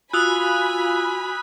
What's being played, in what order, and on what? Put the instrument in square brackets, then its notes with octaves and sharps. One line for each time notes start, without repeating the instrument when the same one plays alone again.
[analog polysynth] F4 [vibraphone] F#4 [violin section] G#5 B5 [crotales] D#6 E6 F#6